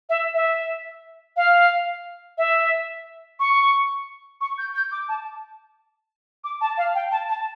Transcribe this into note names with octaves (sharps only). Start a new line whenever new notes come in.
E5
E5
F5
E5
C#6
C#6
G6
G6
D6
A5
D6
A5
F5
G5
A5
A5